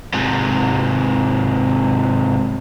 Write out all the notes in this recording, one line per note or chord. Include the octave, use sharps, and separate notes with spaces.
G#2 C3